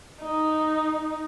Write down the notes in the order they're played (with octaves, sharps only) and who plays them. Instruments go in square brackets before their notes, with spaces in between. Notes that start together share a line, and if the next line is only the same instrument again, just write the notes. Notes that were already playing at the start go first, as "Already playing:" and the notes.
[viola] D#4